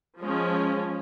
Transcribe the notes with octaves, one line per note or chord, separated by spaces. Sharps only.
F3 G#3 C#4